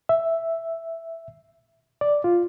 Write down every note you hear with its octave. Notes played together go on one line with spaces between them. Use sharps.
E5
D5
F4